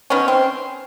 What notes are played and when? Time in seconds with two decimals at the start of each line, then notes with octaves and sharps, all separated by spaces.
0.10 D#3 B3 C#4
0.28 C4